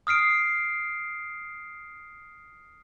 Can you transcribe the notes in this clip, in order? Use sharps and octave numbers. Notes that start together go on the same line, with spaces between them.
D#6 F6 C7 D7